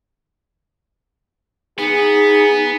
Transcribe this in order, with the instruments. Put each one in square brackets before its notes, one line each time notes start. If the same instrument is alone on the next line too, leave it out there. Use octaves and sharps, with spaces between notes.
[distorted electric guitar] B3 [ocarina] D#4 [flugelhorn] G#4